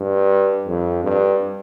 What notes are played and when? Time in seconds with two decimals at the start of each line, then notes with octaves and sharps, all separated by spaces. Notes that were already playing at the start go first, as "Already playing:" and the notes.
Already playing: G2
0.67 F2
1.04 G2